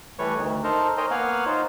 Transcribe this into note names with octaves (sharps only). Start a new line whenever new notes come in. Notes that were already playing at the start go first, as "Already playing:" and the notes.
E3 G3 A3 B4 C#5 C#6
D2 D#3
D#4 A4 A#4 C5 A5
A#4 C5 C#5 D#5 G5 G#5
A#3 B3 C#5 F5 F#5 G#5
D#4 F4 C5